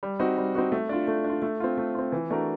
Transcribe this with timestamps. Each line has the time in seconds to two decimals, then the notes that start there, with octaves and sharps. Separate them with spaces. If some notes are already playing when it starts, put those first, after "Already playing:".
0.03 G3
0.19 C4 D#4 F#4
0.38 G3
0.55 C4 D#4 F#4
0.72 A3
0.89 D4 F4
1.08 A3
1.24 D4 F4
1.42 A3
1.60 C4 F4
1.78 A3
1.95 C4 F4
2.12 E3
2.30 A3 D4 F#4 A#4